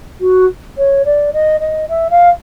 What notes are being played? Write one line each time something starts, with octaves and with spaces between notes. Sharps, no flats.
F#4
C#5
D5
D#5
D#5
E5
F5